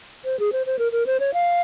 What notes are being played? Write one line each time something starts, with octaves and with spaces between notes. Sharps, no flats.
C5
G#4
C5
C5
A#4
A#4
C5
C#5
F5